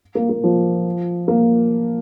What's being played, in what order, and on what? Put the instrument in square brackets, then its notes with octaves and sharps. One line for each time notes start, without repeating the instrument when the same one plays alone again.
[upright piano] A#3
A#3
F3
A#3